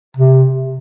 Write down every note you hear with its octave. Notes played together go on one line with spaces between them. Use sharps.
C3